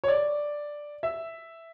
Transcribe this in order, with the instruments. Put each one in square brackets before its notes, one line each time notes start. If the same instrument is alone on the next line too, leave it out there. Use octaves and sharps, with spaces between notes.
[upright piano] C#5
D5
E5